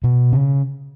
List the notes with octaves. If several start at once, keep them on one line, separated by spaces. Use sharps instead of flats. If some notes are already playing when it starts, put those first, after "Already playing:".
B2
C#3